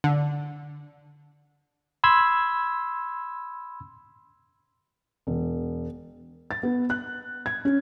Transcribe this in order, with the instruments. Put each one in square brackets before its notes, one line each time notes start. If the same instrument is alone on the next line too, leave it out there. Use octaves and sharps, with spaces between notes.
[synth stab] D3
[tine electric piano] B5 C6 E6 G#6
[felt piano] E1
A6
B3
F#6
G#6
C#4